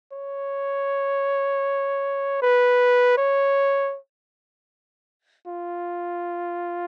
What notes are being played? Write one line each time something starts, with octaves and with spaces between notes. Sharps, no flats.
C#5
B4
C#5
F4